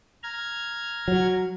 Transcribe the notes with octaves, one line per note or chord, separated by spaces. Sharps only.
A#5 F6 G#6
F#3